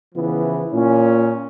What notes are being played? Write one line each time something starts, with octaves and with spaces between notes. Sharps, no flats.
C#3 E3 F3 B3
A#2 C#4